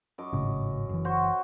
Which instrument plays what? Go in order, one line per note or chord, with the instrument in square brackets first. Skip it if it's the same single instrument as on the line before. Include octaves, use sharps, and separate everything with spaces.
[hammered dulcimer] F#2 D#5 D6
[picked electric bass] G#1 A2 C#3
F#1 E3
[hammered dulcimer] F#4 C5